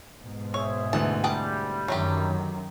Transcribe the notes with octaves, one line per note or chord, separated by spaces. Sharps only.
G#2 B2
G#4 C5 C#5 E5
D2 E3 A5
G3 G#4 G5 A5
F#2 D#3 F#3 A3 G4